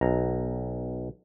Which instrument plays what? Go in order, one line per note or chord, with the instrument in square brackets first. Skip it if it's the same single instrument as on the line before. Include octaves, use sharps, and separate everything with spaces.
[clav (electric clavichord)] B1 A#5